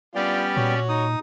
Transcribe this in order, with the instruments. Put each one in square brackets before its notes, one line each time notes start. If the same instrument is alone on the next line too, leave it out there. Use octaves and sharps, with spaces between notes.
[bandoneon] G3 B3 G5 [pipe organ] C#4 G4 D5 [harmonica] D4 F4
[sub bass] A#2 [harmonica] F#4 C#5
[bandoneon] D#4 D#6